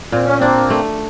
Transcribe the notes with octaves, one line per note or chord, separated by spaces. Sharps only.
A#2 C4
C#4
A#3 C4 D4
A3